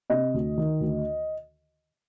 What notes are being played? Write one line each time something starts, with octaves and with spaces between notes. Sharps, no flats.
C3 D#5
D2
D#3
D2